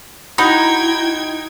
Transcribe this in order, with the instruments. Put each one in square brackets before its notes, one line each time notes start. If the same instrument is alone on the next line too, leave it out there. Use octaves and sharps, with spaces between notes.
[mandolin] D#4 [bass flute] E4 [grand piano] F#4 B5 G6 [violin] G5 G#6